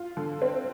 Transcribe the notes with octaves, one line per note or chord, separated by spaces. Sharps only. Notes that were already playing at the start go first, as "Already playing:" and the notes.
Already playing: F4
D3
C4